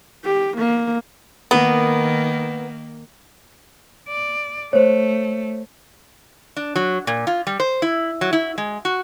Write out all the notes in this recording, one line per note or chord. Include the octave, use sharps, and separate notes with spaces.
G4
A#3
D#3 A#3 B3
D5
A3 C5 C#5
D4
F#3
A#2
F4
G3
C5
E4
F#3
E4
G#3
F#4